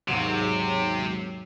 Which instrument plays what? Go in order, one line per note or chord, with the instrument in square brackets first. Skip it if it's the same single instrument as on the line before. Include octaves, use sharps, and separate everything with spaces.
[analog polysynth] D#2 G#2 F#3 [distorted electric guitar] C3